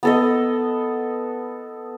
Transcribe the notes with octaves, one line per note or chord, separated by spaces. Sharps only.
B3 A4 D#5